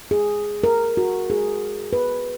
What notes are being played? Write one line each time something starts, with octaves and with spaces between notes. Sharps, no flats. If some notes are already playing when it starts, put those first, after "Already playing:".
G#4
A#4
F#4
G#4
B4